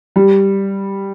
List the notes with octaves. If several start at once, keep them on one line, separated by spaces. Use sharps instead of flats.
G3